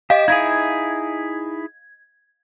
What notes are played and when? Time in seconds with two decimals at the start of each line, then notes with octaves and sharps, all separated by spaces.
0.10 G4 D#5 F5
0.28 D#4 E4 G#4 G#6